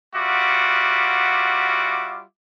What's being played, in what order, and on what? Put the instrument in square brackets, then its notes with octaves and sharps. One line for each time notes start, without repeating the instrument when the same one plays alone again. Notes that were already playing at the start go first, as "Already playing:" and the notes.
[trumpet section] G3 F4 F#4 E5 F#5 D6